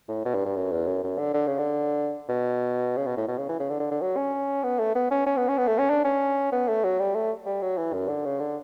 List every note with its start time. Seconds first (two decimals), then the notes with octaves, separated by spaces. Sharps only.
0.08 A2
0.25 B2
0.35 G2
0.46 G2
0.56 F#2
0.72 E2
0.87 F#2
1.04 F#2
1.18 D3
1.34 D3
1.47 C#3
1.59 D3
2.29 B2
2.97 C#3
3.07 B2
3.17 A2
3.28 B2
3.38 C#3
3.49 E3
3.60 C#3
3.70 D3
3.80 D3
3.91 D3
4.02 F#3
4.17 C#4
4.63 B3
4.79 A3
4.95 B3
5.11 C#4
5.27 C#4
5.37 B3
5.48 C#4
5.58 B3
5.68 A3
5.78 C#4
5.90 D4
6.05 C#4
6.53 B3
6.69 A3
6.84 F#3
6.99 G3
7.15 A3
7.46 G3
7.62 F#3
7.78 E3
7.94 F#2
8.08 D3
8.25 C#3
8.40 D3